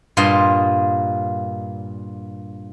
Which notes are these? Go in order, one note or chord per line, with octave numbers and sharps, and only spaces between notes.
G2 A#2 F4 D#5 C6